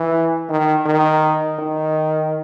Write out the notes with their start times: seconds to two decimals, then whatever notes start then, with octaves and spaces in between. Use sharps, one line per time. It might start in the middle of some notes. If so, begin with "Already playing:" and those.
Already playing: E3
0.49 D#3
0.85 D#3
1.59 D#3